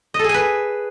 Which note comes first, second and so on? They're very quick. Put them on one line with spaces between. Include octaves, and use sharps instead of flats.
D#5 A4 G#4 G#5 B4